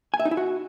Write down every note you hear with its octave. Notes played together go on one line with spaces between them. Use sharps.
G#5
E5
D#4
E4
F#4